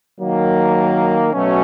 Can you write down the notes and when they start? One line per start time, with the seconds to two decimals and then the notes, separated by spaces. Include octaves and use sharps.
0.19 D#3 F#3 A#3
1.33 B2 F#3 A3 C#4